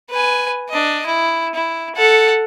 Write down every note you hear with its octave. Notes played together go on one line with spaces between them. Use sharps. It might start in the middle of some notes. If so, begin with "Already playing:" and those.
B4 G#5
D4 D#5
E4
E4
A4 F#5